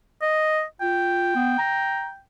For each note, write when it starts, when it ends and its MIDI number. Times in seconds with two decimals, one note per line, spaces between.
0.22 0.63 75
0.81 1.31 65
0.81 2.21 79
1.36 1.55 59
1.59 2.05 82